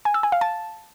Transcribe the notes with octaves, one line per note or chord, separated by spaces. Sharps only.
G#5
E6
G#5
F5
A5